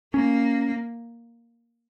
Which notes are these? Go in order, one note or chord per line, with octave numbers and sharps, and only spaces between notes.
A#3 C#4